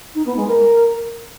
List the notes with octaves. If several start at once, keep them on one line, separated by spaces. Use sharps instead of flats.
D#4
B3
G#3
A#4